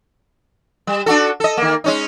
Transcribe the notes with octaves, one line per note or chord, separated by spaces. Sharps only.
G3
D4 F#4 A4
A4 D#5
D#3 A#3
G#3 C#4 D#4